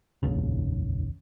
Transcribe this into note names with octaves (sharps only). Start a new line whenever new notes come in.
F1 A#1 D#2 C#3